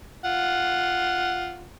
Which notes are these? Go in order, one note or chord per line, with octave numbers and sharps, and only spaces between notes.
F4 F#5